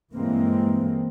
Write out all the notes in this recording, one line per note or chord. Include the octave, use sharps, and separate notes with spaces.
G2 E3 G#3 A#3 C4